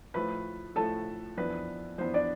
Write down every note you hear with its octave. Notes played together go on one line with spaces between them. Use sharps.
A2 F3 A3 B4 B5
A2 F3 A3 A4 A5
F2 E3 B3 D4 B4
F2 E3 B3 D4 C5
D4 D5